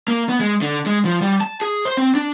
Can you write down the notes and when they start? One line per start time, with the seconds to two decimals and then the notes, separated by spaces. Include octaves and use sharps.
0.08 A#3
0.29 B3
0.40 G#3
0.62 D3
0.86 G#3
1.05 F3
1.21 G3
1.41 A5
1.61 G#4
1.85 C5
1.97 C4
2.15 D4